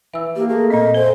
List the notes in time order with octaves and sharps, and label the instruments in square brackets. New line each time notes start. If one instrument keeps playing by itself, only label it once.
[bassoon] E3 [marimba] E5 E6
[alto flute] A#3 [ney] G4
[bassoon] A3 [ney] G#4
[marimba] A#2 C4 [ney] D#5
[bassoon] F2 [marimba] A4 [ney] C5 [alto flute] G#5